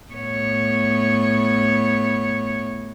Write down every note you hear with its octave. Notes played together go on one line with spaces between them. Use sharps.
A2 B3 C#5